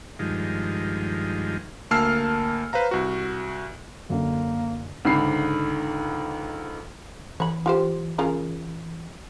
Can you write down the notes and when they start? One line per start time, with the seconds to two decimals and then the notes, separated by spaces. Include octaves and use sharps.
0.19 G2 D#3 F3 G#3
1.91 D2 A#3 A5 E6 F6 C7
2.73 B4 C5 F5 A#5
2.91 C2 F#4
4.10 F#2 D3 A#3
5.05 C#2 G#2 D3 B5 C7
7.40 E3 C#5 B5
7.66 F4 G4 C5
8.18 C#3 F4 A#4